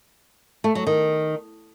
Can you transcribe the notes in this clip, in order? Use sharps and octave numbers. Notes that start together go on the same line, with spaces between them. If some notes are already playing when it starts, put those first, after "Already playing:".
A3
F#3
D#3